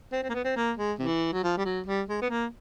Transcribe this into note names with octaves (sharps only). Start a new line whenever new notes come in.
C4
C4
A#3
B3
C4
A#3
G#3
C3 E3
F#3
F3
G3
F#3
G3
G#3
B3
A#3